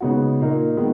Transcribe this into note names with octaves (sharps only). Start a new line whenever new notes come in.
C#3 G#3 B3 D#4 F#4
A#2 A#3 D#4 A#4
D#3 G#3 B3